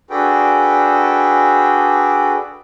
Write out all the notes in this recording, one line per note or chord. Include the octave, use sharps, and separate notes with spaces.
D4 F#4 G#4 A4 B4 G5